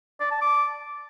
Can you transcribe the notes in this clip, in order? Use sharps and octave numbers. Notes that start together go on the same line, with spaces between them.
D5
A5
D6